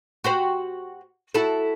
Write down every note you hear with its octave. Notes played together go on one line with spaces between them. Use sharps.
F#4 G4 C5
E4 F#4 A4